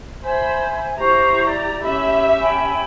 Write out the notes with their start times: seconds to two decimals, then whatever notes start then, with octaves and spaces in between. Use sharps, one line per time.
0.22 C5 E5 G#5 B5
0.98 E4 G4 C5 A#5 C#6
1.45 D5
1.82 C#4 G4 E5 B5
2.41 G5 G#5 B5